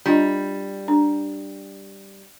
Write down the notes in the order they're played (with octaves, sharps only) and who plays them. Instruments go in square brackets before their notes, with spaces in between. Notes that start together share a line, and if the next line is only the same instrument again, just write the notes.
[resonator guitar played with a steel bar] G3 [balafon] D4 F4 D#5
[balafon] D4